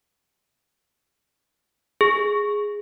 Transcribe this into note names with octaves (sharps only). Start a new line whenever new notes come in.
G#4